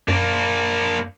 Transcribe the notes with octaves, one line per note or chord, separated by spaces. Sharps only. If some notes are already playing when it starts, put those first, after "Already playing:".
F#2 A#3 D4